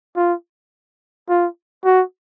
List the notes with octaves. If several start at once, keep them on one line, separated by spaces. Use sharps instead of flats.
F4
F4
F#4